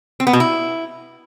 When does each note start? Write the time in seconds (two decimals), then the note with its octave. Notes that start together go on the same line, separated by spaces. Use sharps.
0.20 C4
0.27 B3
0.33 B2
0.40 E4